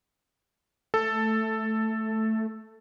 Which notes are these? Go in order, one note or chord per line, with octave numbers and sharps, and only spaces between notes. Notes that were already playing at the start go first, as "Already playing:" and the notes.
A3 A4